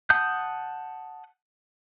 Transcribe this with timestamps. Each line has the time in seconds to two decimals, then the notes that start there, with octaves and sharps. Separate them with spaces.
0.10 F#5 A5 D#6 G6